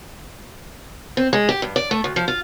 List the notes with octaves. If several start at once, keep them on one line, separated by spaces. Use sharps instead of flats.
C4
G#3
G4
G2
D5
A3
D2
F3
F4